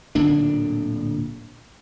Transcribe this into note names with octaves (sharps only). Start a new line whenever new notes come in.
D1 A#2 D3 D4